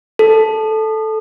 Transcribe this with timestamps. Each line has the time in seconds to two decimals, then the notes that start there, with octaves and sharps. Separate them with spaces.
0.19 A4